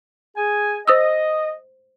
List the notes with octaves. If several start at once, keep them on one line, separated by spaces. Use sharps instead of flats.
G#4 G#5
C5 D#5 D#6 E6